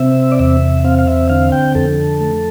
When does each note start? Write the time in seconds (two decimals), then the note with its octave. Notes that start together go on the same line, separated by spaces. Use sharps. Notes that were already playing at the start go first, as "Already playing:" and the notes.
Already playing: C3 C4 E5
0.32 D5
0.39 E2 E5
0.84 C4 F5
0.99 F5
1.07 E5
1.30 D3 F5
1.52 G5
1.75 F2 A4
2.21 A3